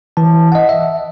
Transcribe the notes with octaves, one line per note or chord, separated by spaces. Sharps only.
E3 A5
D#5 F#5
E5